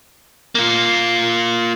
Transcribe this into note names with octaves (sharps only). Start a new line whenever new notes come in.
A#3 F4